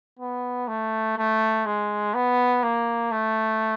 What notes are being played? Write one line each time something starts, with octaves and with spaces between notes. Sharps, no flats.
B3
A3
A3
G#3
B3
A#3
A3